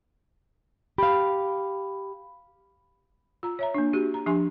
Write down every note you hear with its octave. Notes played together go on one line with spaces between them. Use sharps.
G4 F5 B5
F4 A#5
C#5 E5 A#5
A#3 D4
F#4 G4
A#5
F3 D4 G4 G#5 C6